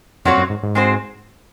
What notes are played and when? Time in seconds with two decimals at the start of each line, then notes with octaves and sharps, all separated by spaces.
0.25 F2 A#2 F#3 C4 F#4 C#5
0.37 F#2
0.50 G#2
0.63 G#2
0.75 G#3 C4 F#4 C5